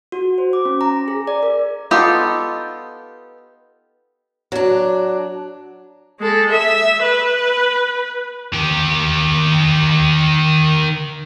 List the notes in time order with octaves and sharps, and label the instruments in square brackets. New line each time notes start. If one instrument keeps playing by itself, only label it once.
[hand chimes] F#4
C5
D6
C#4
A#5
G#4
D5
A#4
[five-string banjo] B3 D#4 F4 G4 A4
[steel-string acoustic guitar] F#3 D4
[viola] G#3 A4
E5
B4
[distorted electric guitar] D#3 G4